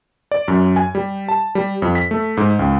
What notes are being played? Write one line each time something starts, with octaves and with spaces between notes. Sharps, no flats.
D5
F#2
G#5
G3
A5
G3
F2
B6
A3
G#2
C#2